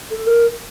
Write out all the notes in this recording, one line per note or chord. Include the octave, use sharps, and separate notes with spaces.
A4
A#4